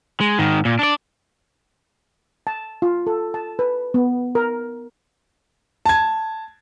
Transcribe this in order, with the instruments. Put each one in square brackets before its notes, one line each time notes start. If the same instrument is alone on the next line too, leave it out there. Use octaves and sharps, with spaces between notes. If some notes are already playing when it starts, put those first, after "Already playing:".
[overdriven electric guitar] G#3
G#2 D#3
A#2
D4 D5
[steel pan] A5
F4
A4
A5
B4
B3
A#4
[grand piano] A5 G#6